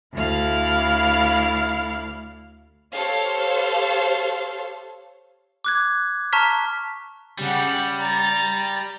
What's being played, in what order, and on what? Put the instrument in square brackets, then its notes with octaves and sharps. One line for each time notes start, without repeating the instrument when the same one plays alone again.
[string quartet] D2 E4 F5 F6
[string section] G4 A4 C5 C#5 F5
[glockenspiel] D6 F#6 G#6
A5 A#5 C#6 F6 B6
[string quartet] C#3 G4 F#5 [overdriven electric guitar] G3
[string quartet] A#5 A6